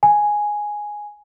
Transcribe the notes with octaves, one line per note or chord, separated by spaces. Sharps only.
G#5